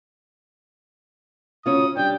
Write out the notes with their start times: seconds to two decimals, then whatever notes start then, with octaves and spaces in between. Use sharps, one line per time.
1.66 D2 C#4 F4 D#6
1.97 G3 D4 G5